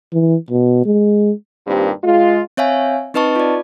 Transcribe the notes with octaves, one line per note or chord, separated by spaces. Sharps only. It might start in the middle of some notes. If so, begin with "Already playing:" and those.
E3
B2
G#3
G2 A#2 D#3 C4 G4
G#3 F4
C4 C#5 E5 F5 G#5
C4 D#4 B4 D#5 A5 C#6
F4 D5